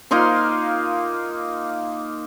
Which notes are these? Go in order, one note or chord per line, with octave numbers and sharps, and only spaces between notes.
A#3 D#4 F4 C6